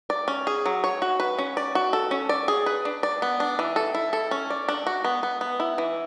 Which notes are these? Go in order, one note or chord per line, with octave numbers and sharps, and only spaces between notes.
D5
C#4
G#4
F#3
C#5
F#4
B4
C#4
D5
F#4
A4
C#4
D5
G#4
B4
D4
D5
B3
D4
E3
A4
E4
A4
C#4
D5
D4
F#4
B3
B3
B3
E4
E3